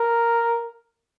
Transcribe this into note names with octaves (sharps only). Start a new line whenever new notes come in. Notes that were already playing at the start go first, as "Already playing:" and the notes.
Already playing: A#4